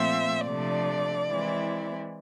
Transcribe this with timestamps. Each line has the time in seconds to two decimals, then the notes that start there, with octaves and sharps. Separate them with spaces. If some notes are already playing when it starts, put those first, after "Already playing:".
Already playing: A#2 F3 A3 C4 F4 E5
0.47 C3 F3 A3 D4 D5
1.28 E3 G#3 C4 E4